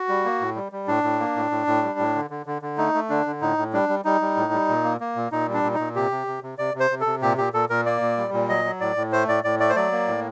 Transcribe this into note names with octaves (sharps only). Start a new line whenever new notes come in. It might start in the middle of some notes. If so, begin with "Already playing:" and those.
Already playing: F#4
G3
A#3
A2
G3
G3
A2 D4
A2
A#3
A2
A2
A2
G3
A2
D3
D3
D3
D3
A3 D#4
A3
D3 D4
D3
A2 D#4
A2
G3 D4
G3
G3 D#4
G3
A2
G3
A#2
A#3
A#3
A#2
A#2 D#4
G3
D4
A#2
A#2 D#4
C3 G4
C3
C3
C3
C3 D5
C3
C5
C3
A4
C3
A#2 G4
A#2 G4
A#2 A4
A#2 A#4
A#3 D5
A#2
G3
A#2
F#3 D#5
F#3
A2 D5
A2
A3 C5
A2 D5
A2 D5
A3 D5
C5
F#3 D5
A#3
A2